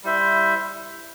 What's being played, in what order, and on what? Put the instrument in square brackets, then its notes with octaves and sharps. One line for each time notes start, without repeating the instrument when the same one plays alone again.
[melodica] G3 E4 C5 E5